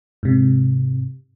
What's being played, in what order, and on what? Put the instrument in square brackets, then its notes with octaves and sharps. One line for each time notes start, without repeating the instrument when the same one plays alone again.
[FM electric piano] G#2 C3